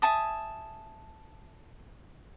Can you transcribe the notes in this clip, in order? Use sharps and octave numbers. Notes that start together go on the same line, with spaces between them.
E5 G#5 A5 D#6